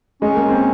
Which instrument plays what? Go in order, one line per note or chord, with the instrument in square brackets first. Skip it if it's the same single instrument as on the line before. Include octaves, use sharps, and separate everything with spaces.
[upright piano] G#3 [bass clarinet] C#4
[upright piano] A#3
C4